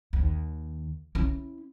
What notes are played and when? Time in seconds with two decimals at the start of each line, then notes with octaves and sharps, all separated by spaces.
0.13 D#2
1.15 C#4 E4